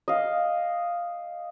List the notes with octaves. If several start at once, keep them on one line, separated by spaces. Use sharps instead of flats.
D#5 F5